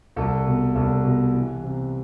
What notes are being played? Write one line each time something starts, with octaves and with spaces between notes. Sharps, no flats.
C2 A4
B2
C2 A4
B2
E3
C3